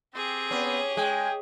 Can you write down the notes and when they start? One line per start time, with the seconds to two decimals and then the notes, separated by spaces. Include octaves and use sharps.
0.15 C4 G4 G#4
0.51 B3 C#4
0.97 G#3 G5 G#5